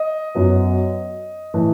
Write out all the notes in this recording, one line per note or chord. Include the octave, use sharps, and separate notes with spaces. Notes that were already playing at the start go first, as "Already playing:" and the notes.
Already playing: D#5
F#2 F#3 B3
A2 E3 A3